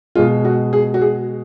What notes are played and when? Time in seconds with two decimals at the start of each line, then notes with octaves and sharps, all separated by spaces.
0.15 B2 G#3 F4
0.45 F#4
0.73 G#4
0.94 F#4
1.01 G#4